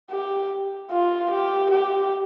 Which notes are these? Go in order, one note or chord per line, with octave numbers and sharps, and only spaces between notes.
G4
F4
G4
G4